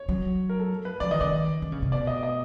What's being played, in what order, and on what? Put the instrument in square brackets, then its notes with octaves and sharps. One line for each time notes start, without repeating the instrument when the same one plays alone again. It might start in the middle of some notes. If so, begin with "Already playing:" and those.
Already playing: [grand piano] C#5
[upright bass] F#3
[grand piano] A#4
A4
B4
[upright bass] F3 [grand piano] D5
[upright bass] D#3 [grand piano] D#5
[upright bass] D#3 [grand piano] D5
[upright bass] D#3
C#3
C3
[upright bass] B2 [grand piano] D5
[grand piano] D#5
D#5